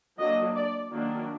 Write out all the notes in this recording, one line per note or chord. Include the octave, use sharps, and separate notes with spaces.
F#3 A#3 D4 D#5
D5
D#3 F#3 A#3 D4